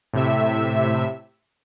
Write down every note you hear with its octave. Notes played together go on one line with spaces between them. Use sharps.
A2 C3 E5